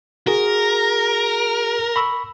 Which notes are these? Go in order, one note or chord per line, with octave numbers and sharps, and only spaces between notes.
F#4 G#4 A#4
B5 C#6 E6